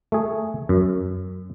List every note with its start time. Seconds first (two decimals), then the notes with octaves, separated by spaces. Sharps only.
0.12 A3 G#4
0.69 F#2